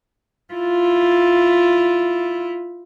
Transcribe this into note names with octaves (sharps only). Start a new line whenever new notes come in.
E4 F4